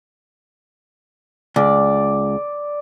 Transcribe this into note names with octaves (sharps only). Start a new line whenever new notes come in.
C#2 D5